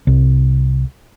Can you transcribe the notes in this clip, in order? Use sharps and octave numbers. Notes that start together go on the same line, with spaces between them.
C2